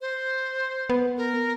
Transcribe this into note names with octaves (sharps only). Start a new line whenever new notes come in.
C5
B3
A#4